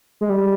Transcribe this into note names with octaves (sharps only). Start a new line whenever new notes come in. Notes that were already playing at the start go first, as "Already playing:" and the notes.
G#3
G3